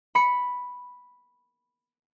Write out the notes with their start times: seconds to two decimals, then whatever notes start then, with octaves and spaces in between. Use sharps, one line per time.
0.15 B5 C#7